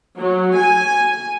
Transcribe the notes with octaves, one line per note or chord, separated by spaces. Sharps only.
F#3
G#5